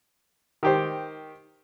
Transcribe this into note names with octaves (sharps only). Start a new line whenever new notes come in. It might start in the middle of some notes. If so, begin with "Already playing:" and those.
D#3 G4 C5